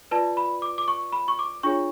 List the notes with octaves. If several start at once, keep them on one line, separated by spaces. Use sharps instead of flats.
F4 B4 D5 A5
B5
D6
D6
C#6
B5
C#6
D6
D4 F4 G#4 C#5 C#6